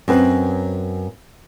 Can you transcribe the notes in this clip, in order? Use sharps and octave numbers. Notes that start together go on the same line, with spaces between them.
F#2 C4 B4